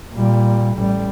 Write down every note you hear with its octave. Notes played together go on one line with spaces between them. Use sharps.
A#2 G3
A1 G3